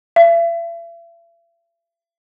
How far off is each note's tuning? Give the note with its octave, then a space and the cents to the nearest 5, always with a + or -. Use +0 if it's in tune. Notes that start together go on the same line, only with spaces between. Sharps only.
E5 +40